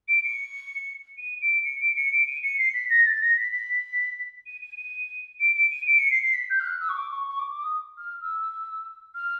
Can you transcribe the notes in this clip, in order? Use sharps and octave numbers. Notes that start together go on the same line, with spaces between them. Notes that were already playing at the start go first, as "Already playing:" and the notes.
D7
C#7
D#7
D7
C#7
D7
C#7
D7
D#7
C#7
C7
B6
A#6
A6
A#6
B6
B6
D#7
D#7
D#7
D7
D7
D#7
D7
C#7
C7
C7
B6
G6
F6
F#6
E6
C#6
D6
C#6
C#6
D6
D6
D#6
F6
E6
F6